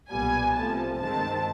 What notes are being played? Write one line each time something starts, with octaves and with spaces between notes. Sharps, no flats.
B1 A#2 G3 B3 G#5
C2 C3 F3 A3 A5
G2 D#3 G#3 C4 A5